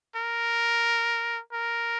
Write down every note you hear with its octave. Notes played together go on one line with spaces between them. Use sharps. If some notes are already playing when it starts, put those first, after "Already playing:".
A#4
A#4